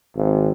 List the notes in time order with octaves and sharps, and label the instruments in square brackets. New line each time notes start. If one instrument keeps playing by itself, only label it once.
[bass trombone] G#1